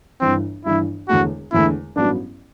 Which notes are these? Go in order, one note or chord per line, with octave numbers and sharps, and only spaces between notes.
G1 G2 E3 C4
G1 G2 E3 E4
E1 E2 D3 A3 F#4
E1 E2 D3 A3 E4
A1 G2 F#3 B3 D4